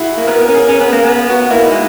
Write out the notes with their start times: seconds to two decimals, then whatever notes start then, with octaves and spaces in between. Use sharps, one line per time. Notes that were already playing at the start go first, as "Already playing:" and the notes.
Already playing: E4 F#4 G#4
0.17 A#3
0.27 B3 A#4
0.42 A#4
0.48 C#4
0.54 G#4
0.68 C#4
0.80 B3
0.93 A#3
1.04 B3
1.30 F#4
1.50 A#3 E4
1.64 D#4
1.71 G#3